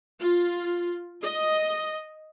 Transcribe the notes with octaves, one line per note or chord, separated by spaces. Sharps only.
F4
D#5